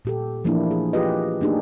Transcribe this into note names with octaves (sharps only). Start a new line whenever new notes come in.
A#2 G4 A4
E3 F3 A3 A#3 D4 E4
G#4
F4 G4 G#4 B4 D#5
A3 A#3 D4 D#4 G4 G#4